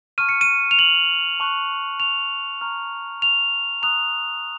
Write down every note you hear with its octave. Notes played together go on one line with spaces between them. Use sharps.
A5 C#6 F6 D#7
C#7
D#7
F7
F#7
A5 C#6 F#6
F7
A#5 C#6 F6
F7
A#5 D#6 F#6 F7